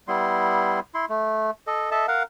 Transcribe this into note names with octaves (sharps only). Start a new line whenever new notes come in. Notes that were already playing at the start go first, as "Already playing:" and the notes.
G3 B3 E4 C6
E4 C6
A3
A4 D#5
A4 D#5 E5 A5
A#4 F5 F#5